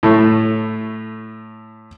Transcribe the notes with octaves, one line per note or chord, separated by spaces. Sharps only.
A2 A3